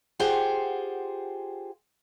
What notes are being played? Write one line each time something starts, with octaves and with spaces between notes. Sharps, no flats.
F4 G4 G#4 C5 F#5 G5